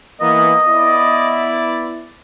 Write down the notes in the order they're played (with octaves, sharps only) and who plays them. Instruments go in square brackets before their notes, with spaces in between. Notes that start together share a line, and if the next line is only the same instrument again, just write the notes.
[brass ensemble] E3 A#3 B3 [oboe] D#5
[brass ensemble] B3 E4 D5